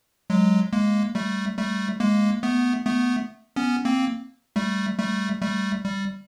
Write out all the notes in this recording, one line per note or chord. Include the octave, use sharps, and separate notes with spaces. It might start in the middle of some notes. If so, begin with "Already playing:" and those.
F#3 G#3
G#3 A#3
G3 A3
G3 A3
G#3 A#3
A3 B3
A3 B3
B3 C#4
A#3 C4
G3 A3
G3 A3
G3 A3
G3